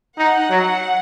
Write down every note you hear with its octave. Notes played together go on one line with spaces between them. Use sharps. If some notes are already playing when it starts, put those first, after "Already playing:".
D#4 F#5
F#3